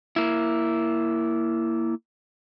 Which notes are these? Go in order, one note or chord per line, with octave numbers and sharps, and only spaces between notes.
A#3 E4